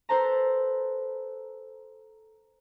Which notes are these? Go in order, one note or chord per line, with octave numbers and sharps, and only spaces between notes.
A4 B4 C5 A5 A#5